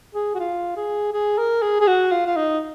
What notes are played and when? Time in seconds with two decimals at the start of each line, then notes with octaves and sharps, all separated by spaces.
0.14 G#4
0.34 F#4
0.39 F4
0.77 G#4
1.13 G#4
1.38 A#4
1.62 G#4
1.81 G#4
1.87 F#4
2.11 F4
2.26 F4
2.36 D#4